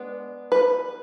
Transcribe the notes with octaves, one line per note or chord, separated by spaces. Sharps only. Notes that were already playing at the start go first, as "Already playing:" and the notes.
Already playing: G#3 B3 D4
B4